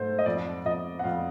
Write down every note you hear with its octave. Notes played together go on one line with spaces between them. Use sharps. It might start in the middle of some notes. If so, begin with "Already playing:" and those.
Already playing: G#2 A3 C5
D#5
F2 D5
F2 D#5
F#5
F2 F5